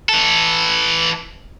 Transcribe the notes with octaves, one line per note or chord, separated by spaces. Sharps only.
E3 A4